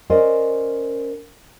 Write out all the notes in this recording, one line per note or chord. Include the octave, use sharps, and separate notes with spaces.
C#4 A#4 C5 D5 D#5